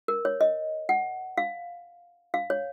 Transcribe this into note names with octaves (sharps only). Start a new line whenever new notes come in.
A#4
C#5
D#5
F#5
F5
F5
C#5